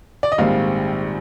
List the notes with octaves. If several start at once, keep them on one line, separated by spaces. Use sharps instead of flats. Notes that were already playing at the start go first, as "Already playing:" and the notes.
D5
D#5
A#1 G#2 D#3 G3 C4 F5